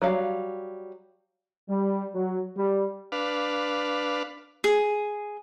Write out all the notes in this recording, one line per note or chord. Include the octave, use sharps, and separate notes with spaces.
F#3 G3 F5
G3
F#3
G3
D4 B4 F5
G#4